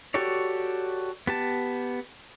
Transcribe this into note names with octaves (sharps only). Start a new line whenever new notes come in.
F#4 G4 A4 C#5 D5
B3 G4 A5